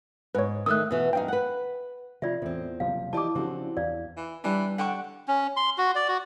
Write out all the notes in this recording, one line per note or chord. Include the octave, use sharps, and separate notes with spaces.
G#2 B4 C#5
D#3 A3 D#6 E6 F#6
B2 E3 F#4
F#2 D4 D#4 F5 G5
B4 F#5
C3 F3 F4 D5 E5
E2 A2 C4
F#1 C3 F3 F5
E3 F3 E4 G4 D5 D#5 A5 D6
C#3 F3 C4 D4 F#4 G4 A4
E2 D5 F5
E3
E3 G3 D4
D3 F#5 G5 C#6
C#4
C6
F#4
D5
F#4